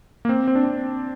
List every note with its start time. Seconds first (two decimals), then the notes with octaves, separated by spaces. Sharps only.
0.25 A#3
0.29 C4
0.48 C4
0.55 D4
0.64 C4